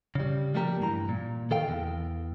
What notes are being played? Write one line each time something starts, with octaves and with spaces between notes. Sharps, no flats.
C#3 G3
F3 G3 A3 A#3 G4 A#5
G2 E3 A#5
A#2
D#3 A4 F5 G5
E2